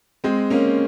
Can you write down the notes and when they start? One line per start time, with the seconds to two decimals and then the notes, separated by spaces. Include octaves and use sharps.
0.24 G#3 C4
0.50 A#3 C#4